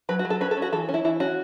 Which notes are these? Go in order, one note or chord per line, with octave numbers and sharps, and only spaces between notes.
F#3 B4
F#4
F#3
A4
C#4 B4
A4
C#4
F#4
E3 A4
C#4
E4
E3 E4
C#4 F#4